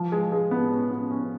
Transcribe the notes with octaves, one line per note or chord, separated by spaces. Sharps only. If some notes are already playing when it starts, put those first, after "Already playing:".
Already playing: F3
G#3
G#3
B3
C#4
B3
C#4